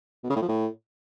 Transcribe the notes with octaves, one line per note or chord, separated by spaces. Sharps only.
B2
C#3
A2
F3
A2